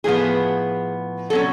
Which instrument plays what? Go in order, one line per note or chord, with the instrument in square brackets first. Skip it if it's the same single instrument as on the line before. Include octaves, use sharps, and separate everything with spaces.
[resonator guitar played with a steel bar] A2 F3 B3 G#4
B2 F#3 C#4 A4